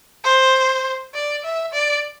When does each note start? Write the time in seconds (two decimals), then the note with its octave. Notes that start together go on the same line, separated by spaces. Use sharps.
0.24 C5
1.15 D5
1.44 E5
1.73 D5